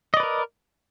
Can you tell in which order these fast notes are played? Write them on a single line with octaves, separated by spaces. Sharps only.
D#5 D5 B4 A#4